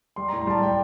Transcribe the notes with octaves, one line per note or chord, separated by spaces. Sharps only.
G3 C6
A2 A#5
C6
G3 A5
G3 G5